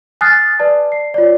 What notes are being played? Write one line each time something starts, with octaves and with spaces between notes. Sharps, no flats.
G#5 D#6 F6 F#6 A6 C7
B4 D5 A5
C7
F4 C#5 D5